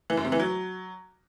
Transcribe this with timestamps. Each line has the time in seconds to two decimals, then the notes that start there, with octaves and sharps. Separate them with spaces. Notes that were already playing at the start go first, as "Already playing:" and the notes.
0.10 E3
0.17 F#2
0.25 C3
0.32 E3
0.40 F#3